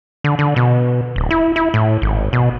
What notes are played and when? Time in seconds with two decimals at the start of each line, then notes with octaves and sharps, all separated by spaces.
0.24 D3
0.39 D3
0.56 B2
1.16 D1
1.31 E4
1.56 E4
1.74 A2
2.02 G#1
2.33 B2